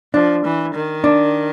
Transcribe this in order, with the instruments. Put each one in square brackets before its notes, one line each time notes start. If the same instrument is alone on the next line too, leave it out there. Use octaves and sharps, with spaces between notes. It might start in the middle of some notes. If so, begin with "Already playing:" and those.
[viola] F3 [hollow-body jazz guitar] D4
[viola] E3
D#3
[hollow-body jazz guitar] D4